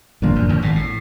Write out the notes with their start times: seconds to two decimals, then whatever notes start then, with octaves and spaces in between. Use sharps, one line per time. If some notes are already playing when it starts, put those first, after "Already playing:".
0.22 G1 G2 A#2 F3 A#3 D4
0.36 F#1 F#2
0.49 G1 G2
0.62 G#1 G#2
0.76 A2